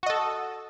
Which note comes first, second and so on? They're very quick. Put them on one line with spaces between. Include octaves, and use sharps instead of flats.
F#4 D#5 A4